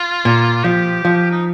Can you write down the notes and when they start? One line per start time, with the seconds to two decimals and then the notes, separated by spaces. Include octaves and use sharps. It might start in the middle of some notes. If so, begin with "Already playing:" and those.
Already playing: F4
0.25 A#2
0.64 F3 G4
1.05 F3
1.31 D#4